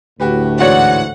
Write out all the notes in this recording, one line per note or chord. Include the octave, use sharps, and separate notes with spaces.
D2 A2 F#4 G4 B4
G#2 E3 G#3 F#4 C#5 D5 F#5